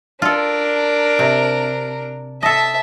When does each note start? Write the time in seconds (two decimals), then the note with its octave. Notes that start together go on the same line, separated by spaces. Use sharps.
0.22 D4 F4 A4 A#4
1.19 C3
2.43 A4 D#5 E5 A5